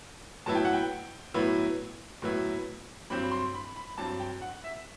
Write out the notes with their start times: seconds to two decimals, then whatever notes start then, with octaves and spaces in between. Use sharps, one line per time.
0.46 A2 F#3 B3 E4 A5
0.55 G5
0.65 F#5
0.73 G5
1.34 A2 F#3 B3 E4
2.22 A2 F#3 B3 E4
3.10 G2 F#3 C4 B5
3.31 C6
3.54 B5
3.76 B5
3.98 G2 F#3 C4 A5
4.20 G5
4.42 F#5
4.64 E5